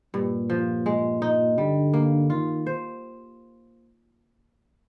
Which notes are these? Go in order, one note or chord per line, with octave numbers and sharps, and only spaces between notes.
G2 A#2
F3
G#3
D#4
D3 G3
A#3
D#3 F4
C5